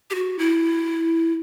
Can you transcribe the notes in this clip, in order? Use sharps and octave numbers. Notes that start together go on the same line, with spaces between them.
G4
F#4
E4